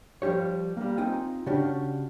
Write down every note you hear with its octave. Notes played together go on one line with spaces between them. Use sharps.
F3 G3 G4 C#5
G3 A#3
C4 D#4 F4 G5 G#5
C#3 C#4 D4 F#4 G4